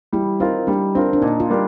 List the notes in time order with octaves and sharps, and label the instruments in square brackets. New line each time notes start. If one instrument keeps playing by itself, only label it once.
[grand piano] G3 [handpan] E4
[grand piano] C4 F4 A#4 [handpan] D#4
[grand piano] G3 [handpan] D4
[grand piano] C4 F4 A#4 [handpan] D4
[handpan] D4
[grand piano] A#2 [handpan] D#4
[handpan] F4
[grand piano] G3 A#3 D4 G4